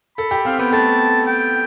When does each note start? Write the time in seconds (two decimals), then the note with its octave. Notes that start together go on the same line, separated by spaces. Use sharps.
0.17 A4 B5
0.31 G4
0.45 C4 F5
0.59 B3 G5
0.73 A3 A5
1.27 G5